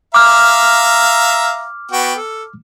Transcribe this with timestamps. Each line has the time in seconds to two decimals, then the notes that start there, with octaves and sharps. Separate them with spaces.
0.14 E5 F5 A#5 D6 F6
1.91 B3 F#4 G5
2.15 A4